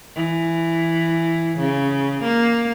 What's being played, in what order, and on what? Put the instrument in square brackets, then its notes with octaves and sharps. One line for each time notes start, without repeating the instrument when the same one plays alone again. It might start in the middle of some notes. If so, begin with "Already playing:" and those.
[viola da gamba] E3
C#3
A#3